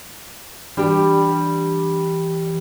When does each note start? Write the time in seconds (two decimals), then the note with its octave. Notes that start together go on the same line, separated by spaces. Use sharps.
0.77 E3 G3 D4 G4